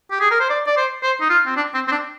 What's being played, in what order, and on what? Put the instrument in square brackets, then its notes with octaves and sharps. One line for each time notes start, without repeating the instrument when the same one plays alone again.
[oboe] G4
G#4
A#4
C5
D5
D5
C5
C5
D#4
F4
C4
D4
C4
C4
D4